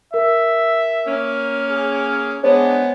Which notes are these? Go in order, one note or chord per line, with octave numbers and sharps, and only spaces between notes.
A#4 E5
A#3 C#4
G#4
G#3 B3 D4 C5 C#5